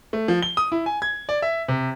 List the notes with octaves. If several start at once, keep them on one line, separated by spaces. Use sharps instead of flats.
A3
F3
G7
D#6
E4
G#5
G#6
D5
E5
C3